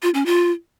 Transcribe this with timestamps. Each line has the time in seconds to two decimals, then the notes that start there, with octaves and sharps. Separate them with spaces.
0.03 F4
0.14 C#4
0.26 F4